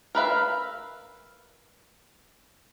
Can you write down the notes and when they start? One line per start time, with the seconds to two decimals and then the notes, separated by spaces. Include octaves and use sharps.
0.15 A#4 B4 E5 F5